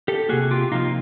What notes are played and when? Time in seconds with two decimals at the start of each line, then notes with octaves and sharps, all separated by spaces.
0.08 G4 A4
0.29 C3 F3 A#3 F#4 G#4
0.51 F4 G4
0.72 C3 F3 A#3 D#4 F4